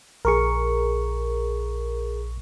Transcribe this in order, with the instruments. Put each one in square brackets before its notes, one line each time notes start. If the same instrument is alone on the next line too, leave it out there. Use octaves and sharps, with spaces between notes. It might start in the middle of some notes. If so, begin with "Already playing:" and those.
[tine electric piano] A#1 C#6 C#7 [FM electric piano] G#4 A#4